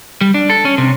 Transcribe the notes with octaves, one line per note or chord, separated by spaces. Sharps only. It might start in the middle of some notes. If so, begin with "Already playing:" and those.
G3
D4
A4
C#4
C3